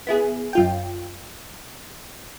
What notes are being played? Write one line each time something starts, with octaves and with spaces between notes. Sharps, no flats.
B3 E4 G#4
F#2 F4 G5